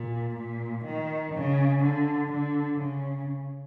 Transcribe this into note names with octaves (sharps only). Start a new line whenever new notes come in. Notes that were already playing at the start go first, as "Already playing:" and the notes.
Already playing: A#2
A#2
D#3
C#3
D3
D3
C#3